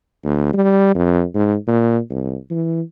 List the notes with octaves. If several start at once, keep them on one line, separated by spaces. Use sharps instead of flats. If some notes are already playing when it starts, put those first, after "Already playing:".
D2
G3
F2
G#2
A#2
C2
E3